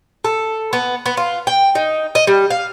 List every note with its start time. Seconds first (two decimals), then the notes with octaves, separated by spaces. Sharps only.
0.25 A4
0.73 B3
1.06 B3
1.17 F4
1.47 G5
1.75 D#4
2.15 D#5
2.27 G3
2.50 F5